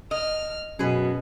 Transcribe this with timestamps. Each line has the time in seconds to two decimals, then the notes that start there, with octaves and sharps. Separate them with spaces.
0.11 D#5 F6
0.79 F#2 B2 G#4 B4